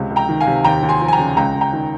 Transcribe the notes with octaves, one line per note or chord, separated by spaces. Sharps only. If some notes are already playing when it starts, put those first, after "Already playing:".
Already playing: C#2 C3
C#2
G5 A#5
D#3
F5 G#5
C3
D#2 G5 A#5
D#2
G#5 C6
F3
G#5
G5 A#5
C#3
C#2 G5 A#5
C#2
G5 A#5
D#3